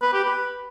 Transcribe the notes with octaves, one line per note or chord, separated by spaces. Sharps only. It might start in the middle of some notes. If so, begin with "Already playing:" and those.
B4
G4
B4